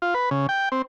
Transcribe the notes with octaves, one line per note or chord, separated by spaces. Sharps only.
F4
B4
C#3
G5
C4